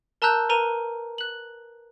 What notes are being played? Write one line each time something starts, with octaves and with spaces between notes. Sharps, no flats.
A#4 A5 A#5 E6 F#6 G6
A#4 B4 A#5 D#7
F#6 F#7